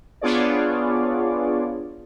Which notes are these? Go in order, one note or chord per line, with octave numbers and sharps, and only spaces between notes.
B3 D4 F4 G#4 C#5 D5